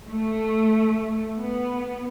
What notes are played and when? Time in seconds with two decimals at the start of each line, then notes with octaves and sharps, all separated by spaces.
0.11 A3
1.39 B3